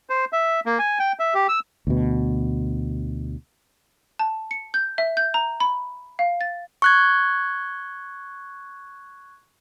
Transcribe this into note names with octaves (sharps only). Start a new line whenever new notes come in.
C5
E5
A#3
G#5
G5
E5
G4
E6
D2 B2
A5
C#7
G6
E5
G6
A#5
B5
F5
A6
C#6 F#6 G#6